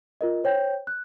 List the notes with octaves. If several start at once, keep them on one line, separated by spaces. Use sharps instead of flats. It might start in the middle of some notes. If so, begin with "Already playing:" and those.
F4 A#4 D#5
C5 C#5 G5 G6
F#6